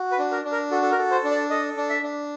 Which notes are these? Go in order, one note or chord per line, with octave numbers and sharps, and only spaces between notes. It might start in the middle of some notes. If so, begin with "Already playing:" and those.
Already playing: F#4
B4
D4
A#4
D4
A#4
F#4 A4
A4
A#4
A4
C5
D4
D5
A4 D#5
D4
E5
D4